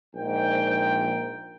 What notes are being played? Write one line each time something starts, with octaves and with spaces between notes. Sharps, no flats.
A#1 G#2 G5